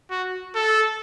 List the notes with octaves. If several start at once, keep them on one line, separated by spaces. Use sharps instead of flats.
F#4
A4